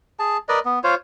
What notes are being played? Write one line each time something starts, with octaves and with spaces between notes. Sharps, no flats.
G#4 A5
A#4 B4 D5 D#5
B3
F4 C5 C#5